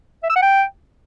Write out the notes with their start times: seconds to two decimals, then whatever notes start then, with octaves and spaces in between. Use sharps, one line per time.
0.23 E5
0.29 E6
0.36 F#5
0.42 G5